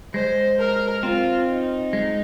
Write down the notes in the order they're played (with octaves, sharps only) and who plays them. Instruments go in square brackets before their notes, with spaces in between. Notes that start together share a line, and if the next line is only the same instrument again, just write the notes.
[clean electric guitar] G#3 [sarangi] C5
[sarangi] A#4
[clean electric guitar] C4 [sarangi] F4
[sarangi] D#4
[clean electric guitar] G#3